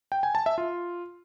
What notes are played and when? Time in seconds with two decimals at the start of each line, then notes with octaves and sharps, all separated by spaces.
0.12 G5
0.23 G#5
0.35 A5
0.46 E5
0.58 F4